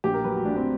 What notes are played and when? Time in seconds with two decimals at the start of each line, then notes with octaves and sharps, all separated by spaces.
0.04 A#1 G4
0.14 A#4
0.24 F#3 B4
0.36 F#4
0.45 A#1 D4
0.56 C4